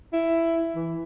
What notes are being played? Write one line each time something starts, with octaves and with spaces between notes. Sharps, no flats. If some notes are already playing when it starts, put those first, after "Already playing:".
E4
E3